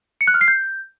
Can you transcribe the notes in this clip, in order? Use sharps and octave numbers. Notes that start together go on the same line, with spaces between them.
C#7
F#6
F6
C7
G6